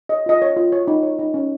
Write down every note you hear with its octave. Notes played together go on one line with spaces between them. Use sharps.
C#5 D#5
F4 D#5
C#5
F4
C#5
D#4
C#5
D#4
C#4